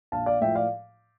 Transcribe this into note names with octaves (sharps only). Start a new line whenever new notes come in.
A#1 F5 A5
D5 F5
A2 F3 E5 G5
D5 F5